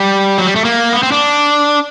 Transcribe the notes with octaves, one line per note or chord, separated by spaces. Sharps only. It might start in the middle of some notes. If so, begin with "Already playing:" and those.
Already playing: G3
F#3
G3
A3
A#3
B3
C4
D4